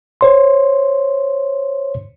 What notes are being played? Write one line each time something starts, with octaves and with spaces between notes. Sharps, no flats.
C5 C#5 C6